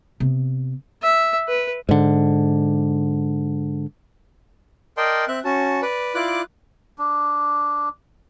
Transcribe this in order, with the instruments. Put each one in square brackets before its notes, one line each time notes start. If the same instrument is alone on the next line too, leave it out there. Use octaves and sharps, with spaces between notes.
[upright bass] C3 B3
[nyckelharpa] E5
B4
[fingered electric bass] G#2 D3
[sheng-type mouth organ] A#4 D5 D#5 G5 A5 C6
C4 E5 F#6
C#4 F#4 A5
B4 D5
E4 F4 D5 D6 F#6
[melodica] D4